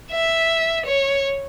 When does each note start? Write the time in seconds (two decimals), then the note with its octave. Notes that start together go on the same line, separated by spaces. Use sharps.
0.12 E5
0.86 C#5